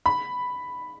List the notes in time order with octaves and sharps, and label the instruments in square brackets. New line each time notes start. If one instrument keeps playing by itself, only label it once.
[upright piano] B5